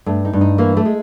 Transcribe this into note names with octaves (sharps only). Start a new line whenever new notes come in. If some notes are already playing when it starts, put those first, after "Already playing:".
G2 A3
D#4
G2
D#4
E3 A#3
A3
G#3